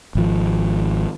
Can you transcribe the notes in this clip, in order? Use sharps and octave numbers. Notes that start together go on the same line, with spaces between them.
G#1 F3